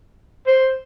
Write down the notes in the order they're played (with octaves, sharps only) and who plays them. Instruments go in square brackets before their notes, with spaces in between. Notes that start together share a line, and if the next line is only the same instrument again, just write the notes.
[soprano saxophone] C5